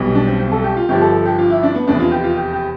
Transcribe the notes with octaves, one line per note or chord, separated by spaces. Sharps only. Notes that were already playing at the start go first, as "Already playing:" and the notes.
Already playing: B1 B2 G3
D4
C4
C4
A4
G4
F4
G1 G2 F3 G4
A4
A4
G4
F4
E4
D4
B3
F1 E2 C3 D4
F4
G4
F4
G4
G4